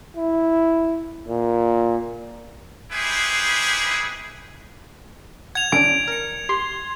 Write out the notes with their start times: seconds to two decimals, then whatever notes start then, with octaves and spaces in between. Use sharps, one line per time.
0.17 E4
1.28 A#2
2.91 D#4 E4 G4 G#4 B4 C5
5.55 F#5 G#6 F7
5.72 C#4 D4 D5 D7
6.08 A#4 C#7
6.49 G4 C6